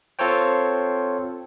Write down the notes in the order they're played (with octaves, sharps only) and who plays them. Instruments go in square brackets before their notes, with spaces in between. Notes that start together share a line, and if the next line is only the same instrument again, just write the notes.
[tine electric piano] C4 F4 A4 C5 C#5 G5